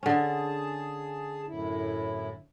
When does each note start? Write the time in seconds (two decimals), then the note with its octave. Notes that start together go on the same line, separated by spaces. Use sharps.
0.03 D3 C#4 G#4 A5
1.47 F#2 A2 E4